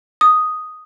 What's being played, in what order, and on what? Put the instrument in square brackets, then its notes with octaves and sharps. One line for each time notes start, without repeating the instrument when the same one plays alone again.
[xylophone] D#6